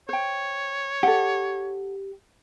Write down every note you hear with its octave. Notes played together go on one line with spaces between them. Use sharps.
C5 C#5 G5
G4 A4 F#5